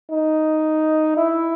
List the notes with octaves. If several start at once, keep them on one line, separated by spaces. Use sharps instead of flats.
D#4
E4